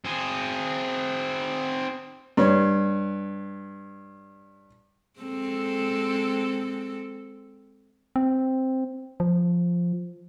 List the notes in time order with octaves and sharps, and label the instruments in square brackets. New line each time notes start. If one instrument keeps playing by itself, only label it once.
[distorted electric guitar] C4 G#4
[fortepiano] G2 C#5
[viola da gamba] G#3 C4 A4
[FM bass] C4
F3